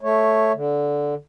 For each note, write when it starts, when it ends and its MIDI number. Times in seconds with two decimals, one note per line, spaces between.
0.01 0.52 57
0.01 0.52 73
0.54 1.14 50